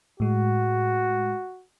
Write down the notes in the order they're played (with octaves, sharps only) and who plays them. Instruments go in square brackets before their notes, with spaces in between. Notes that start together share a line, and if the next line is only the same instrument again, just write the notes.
[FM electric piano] A2 G#3 [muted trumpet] F#4